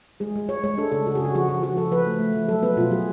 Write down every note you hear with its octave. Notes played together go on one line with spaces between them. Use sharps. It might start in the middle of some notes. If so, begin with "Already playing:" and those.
G#3 G#4
G#3
G#3 C#5
G#3 C#5
D4 A4
C#3 A4
C#3 F#4
G#4
C#3 F#4
F3 F#4
F3 F#4
F3 F#4
F3 A4
F3 B4
A3
A3
F3
F#3 A4
B3 B4
B2 F4
F#3 G#4